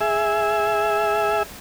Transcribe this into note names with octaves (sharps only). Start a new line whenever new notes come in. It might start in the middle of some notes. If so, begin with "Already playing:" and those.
G#4 E5